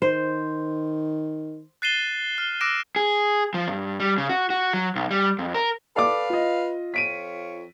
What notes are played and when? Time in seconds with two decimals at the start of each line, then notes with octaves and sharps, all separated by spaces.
0.02 D#3 C5
1.82 F#6 A6 C7 D#7 E7 G7
2.38 F6
2.61 D6 E6 F#6 A#6 D7 E7
2.96 G#4
3.54 F3
3.68 G2
4.00 G3
4.18 C#3
4.29 F#4
4.50 F#4
4.73 F#3
4.95 B1
5.11 G3
5.39 F2
5.54 A#4
5.96 A4 B4 D5 F5 D6
6.29 F4 D#5
6.94 F2 F4 C#5 B6 D7 D#7